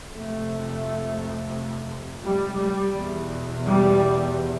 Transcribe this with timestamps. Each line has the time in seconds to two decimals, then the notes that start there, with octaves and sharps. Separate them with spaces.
0.11 F2 C3 A3
2.23 G3
2.57 G3
2.93 E2 B2
3.64 G3